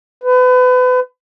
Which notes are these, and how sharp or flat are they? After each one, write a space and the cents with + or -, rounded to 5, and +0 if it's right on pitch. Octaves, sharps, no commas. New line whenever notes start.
B4 +30